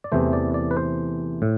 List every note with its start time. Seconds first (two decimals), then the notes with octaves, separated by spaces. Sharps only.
0.04 D5
0.12 E2 C3 E3 A3 C5
0.33 D5
0.54 D5
0.71 B4
0.77 C5
1.42 A2